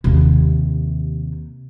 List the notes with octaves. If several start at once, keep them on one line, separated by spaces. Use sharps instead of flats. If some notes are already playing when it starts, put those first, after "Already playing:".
D#2 C3